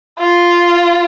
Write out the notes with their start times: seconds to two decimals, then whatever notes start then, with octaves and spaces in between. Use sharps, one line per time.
0.19 F4